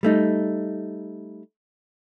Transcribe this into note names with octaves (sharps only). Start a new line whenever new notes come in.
G3 A3 D#4